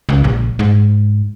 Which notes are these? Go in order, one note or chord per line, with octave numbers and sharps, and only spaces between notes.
C#2
A#1
G#2